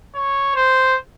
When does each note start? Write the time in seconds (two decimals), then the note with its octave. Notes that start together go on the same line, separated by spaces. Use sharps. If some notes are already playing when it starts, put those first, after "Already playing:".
0.15 C#5
0.55 C5